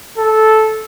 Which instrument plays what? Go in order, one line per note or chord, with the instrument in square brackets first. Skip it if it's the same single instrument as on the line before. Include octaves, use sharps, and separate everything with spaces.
[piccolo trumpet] A4